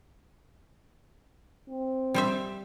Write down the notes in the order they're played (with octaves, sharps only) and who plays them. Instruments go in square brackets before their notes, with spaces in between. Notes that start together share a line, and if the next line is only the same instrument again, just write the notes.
[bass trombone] C4
[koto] G3 C5 E5